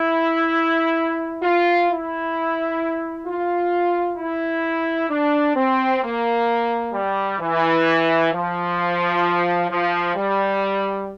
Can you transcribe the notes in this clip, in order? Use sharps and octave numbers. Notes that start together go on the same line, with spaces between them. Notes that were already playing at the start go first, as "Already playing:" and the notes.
Already playing: E4
F4
E4
F4
E4
D4
C4
A#3
G3
E3
F3
F3
G3